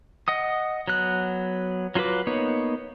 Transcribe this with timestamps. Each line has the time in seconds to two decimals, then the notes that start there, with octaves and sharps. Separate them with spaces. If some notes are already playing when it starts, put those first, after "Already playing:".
0.28 D#5 F#5 D#6
0.88 F#3 B3 F#6
1.95 F#3 F4 F#4 B4 D6
2.27 A#3 B3 D#4 C#5